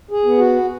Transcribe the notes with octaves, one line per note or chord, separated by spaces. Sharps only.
G#4
B3
F#4